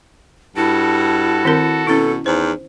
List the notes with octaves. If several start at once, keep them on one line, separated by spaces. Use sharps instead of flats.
G2 E4 F#4 A4
D#3 C4 A#4
B2 C#4 E4 A4
E2 D#4 C5